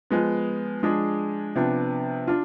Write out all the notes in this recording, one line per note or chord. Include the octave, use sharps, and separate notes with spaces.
F3 G#3 B3
F3 G#3 D4 G#4
C3 F3 B3 D4
D4 F4